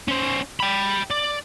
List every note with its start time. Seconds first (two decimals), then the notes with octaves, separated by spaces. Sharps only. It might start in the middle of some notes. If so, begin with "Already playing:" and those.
0.08 C#4 C5
0.60 G5 B5
1.10 D5